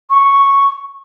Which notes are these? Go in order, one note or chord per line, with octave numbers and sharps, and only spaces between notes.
C#6